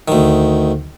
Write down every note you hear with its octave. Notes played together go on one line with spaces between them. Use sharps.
D2 D#3